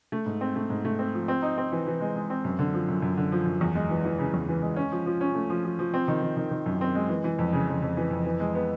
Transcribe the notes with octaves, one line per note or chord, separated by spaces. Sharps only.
A3
G#2
C4
A3
G#2
A3
C4
F3
C4
D#4
C4
E3
E3
G#3
G#3
C4
F#2
D3
F3
F#2
F#2
D3
F3
F#2
E2
G#3
E3
E3
C#3
E2
E3
G#3
C#4
F3
F3
C#4
A3
F3
F3
F3
C4
D#3
D#3
D#3
D#3
F#2
C4
G#3
E3
E3
F2
C#3
F2
F2
E3
F2
E3
G#3
B3